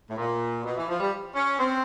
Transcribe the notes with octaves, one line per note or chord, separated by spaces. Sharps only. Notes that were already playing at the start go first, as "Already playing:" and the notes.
A2
A#2
B2
E3
F3
G3
C#4
C4